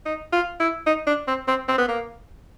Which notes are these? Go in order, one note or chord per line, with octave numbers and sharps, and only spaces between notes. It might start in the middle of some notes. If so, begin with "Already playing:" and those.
D#4
F4
E4
D#4
D4
C4
C4
C4
B3
A#3